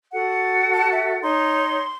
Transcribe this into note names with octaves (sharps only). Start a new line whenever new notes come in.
F#4 A4 F#5
A5
E5
D#4 C#5 C6